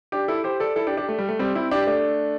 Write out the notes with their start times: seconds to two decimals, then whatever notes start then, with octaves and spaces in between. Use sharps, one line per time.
0.12 D4 G4
0.28 E4 A4
0.44 G4 C5
0.60 A4 D5
0.76 E4 A4
0.87 D4 G4
0.97 D4 G4
1.09 A3
1.18 G3
1.29 A3
1.39 G3 C4
1.55 C4 E4
1.71 D4 G4
1.87 A3 D4